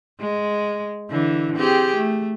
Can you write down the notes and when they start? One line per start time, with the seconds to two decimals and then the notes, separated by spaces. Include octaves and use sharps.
0.20 G#3
1.10 D3 E3
1.56 C4 G4 G#4
1.96 A3